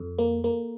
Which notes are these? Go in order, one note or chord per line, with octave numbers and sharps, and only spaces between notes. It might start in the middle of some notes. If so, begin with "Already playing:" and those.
Already playing: F2 A4
A#3
A#3